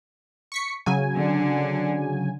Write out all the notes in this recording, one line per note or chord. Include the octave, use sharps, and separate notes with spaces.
C#6 B6 C#7
C#3 F#3 G#5
D3